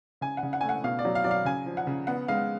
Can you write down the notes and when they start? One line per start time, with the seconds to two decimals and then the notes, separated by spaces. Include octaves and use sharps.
0.21 C#3 G#5
0.37 F#5
0.43 C#3
0.53 F#5
0.61 G#5
0.63 A3
0.69 F#5
0.84 B2 F5
0.99 D5
1.05 F#3
1.15 F5
1.24 F#3 D5
1.31 F5
1.45 C#3 G#5
1.66 F3
1.77 F#5
1.87 C#3
2.07 B3 F#5
2.28 G#3 F5